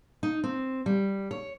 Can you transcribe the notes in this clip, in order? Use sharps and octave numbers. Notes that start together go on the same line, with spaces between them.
D#4
C4
G3
C#5